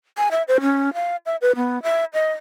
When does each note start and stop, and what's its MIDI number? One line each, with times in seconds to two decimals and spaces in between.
0.17 0.29 80
0.31 0.43 76
0.48 0.57 72
0.61 0.94 61
0.94 1.16 77
1.26 1.36 76
1.41 1.52 71
1.56 1.82 59
1.83 2.04 76
2.13 2.32 75